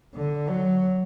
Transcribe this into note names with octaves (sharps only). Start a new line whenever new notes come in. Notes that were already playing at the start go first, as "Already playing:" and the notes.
D3
F#3